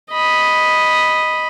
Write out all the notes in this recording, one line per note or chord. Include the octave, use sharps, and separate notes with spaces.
D#5 B5